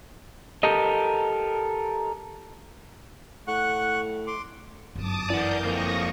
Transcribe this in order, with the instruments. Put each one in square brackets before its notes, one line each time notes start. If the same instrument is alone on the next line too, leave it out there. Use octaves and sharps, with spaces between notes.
[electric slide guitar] G4 A4 A#4 D#5
[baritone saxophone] A2 [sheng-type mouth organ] F#5 C#6 F#6
[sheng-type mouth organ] C6 D6
[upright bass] G1 F#2 [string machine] A5 D6 D#6
[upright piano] E3 [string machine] A#4 G6 [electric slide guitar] D5 F#5
[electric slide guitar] F2 A#3 [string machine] C#6 D#6 A#6